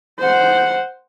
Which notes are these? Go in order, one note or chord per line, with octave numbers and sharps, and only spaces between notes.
C5 F#5